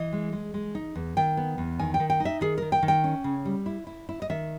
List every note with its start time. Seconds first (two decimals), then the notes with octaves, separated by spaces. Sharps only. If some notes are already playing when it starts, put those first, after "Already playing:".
Already playing: E3 D#5
0.12 G#3
0.33 G#3
0.54 G#3
0.75 D#4
0.96 E2
1.17 D#3 G5
1.37 B3
1.58 E2
1.79 D#3 G#5
1.94 G5
2.00 D#3
2.10 G5
2.20 D#4
2.25 E5
2.41 D#3 G#4
2.58 D#3 A#4
2.72 G5
2.83 D#3
2.88 G5
3.04 C#4
3.24 C#3
3.45 G3
3.66 E4
3.87 E4
4.09 E4
4.22 D#5
4.30 D#3 E5